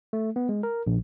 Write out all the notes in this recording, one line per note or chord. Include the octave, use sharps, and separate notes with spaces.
A3
B3
G#3
A#4
A#1